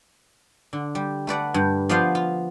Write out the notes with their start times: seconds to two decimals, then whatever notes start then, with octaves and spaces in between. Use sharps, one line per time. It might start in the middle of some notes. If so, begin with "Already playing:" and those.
0.73 D3
0.95 G3
1.27 A3 B4 D5 F#5
1.54 G2
1.89 F3 B3 F4 D5 F5 C6
2.15 F4